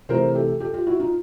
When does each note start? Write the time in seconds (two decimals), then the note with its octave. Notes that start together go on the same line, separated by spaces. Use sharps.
0.09 C3 E3 A3 A#4 C5
0.35 G4 A4
0.60 G4 A4
0.74 F4 G4
0.87 E4 F#4
0.99 D#4 F4